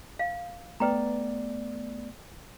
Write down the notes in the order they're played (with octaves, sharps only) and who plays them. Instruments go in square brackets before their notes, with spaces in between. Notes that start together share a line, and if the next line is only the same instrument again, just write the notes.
[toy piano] F5
[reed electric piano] A3 B3 D5 [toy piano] B4 G5 A#5